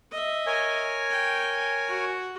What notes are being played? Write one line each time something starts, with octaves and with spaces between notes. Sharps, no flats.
D#5 E5
A#4 C#5 G#5
G5
F#4